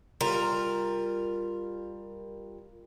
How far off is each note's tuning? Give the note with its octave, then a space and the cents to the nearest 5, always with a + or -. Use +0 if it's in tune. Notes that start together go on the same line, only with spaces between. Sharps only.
G3 +15 F4 +0 A#4 +0